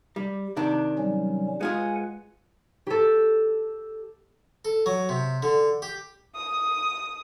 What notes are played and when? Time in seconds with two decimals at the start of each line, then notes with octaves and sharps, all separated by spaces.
0.16 G3
0.57 C3 D#3 D4
0.98 F#3 G3 C#4
1.61 G#3 F4 G#4 B4 F#5 G#5
2.87 G4 A4
4.65 A4
4.86 F#3
5.09 C3
5.43 D3
5.82 G4
6.36 D#6